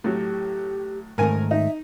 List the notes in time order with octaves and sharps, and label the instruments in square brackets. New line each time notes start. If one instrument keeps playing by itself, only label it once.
[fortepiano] A2 F#3 [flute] G4
[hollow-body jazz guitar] G#2 D#3 A3 [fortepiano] A#4 G#5
[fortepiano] D#4 [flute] E5